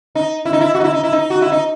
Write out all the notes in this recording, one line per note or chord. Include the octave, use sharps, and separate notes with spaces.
D#4
E4
D#4
E4
F#4
D#4
E4
D#4
E4
D#4
F#4
E4
D#4